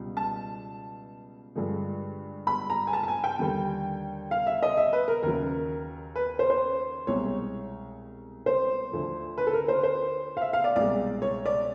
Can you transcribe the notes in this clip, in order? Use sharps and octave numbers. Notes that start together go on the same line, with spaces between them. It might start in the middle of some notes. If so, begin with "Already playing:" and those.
Already playing: C#2 B2 G3
A5
G2 D3 F3 G#3
B5
A#5
G#5
A5
A5
G#5
G5
D#2 D3 G3
F5
E5
D#5
E5
B4
A#4
D#2 C#3 F#3 A#4
B4
C5
C5
C2 B2 G#3 C#5
C5
D2 D3 F3
B4
A4
A#4
C5
C5
F5
E5
F5
D5
C2 B2 G#3 D5
C#5
D5